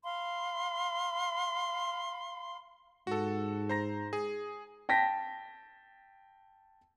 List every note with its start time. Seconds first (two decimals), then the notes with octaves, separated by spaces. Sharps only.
0.04 F5 B5 C6
3.07 G#2 F#4 A4
3.69 C5 A#5 A#6
4.13 G#4
4.89 G5 A5 A#6 B6